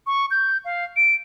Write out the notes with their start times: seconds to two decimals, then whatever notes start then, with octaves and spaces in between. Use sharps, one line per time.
0.07 C#6
0.31 G6
0.65 F5
0.96 D7